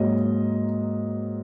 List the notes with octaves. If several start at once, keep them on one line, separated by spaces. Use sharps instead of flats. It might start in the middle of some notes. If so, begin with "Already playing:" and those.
Already playing: G#2 F#3 A#3 D#5